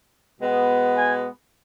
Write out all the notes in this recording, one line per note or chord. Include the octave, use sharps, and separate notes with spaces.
B2 G#3 B3
G#5